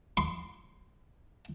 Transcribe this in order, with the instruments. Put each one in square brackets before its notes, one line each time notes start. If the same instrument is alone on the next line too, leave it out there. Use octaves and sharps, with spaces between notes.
[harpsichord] C6